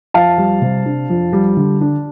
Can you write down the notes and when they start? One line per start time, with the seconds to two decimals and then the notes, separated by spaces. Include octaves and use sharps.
0.14 F2 F5 A5
0.38 G3
0.62 C3
0.86 D4
1.10 F2
1.33 G3
1.57 D3
1.81 D4